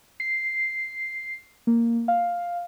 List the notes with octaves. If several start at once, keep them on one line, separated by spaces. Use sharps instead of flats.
C7
A#3
F5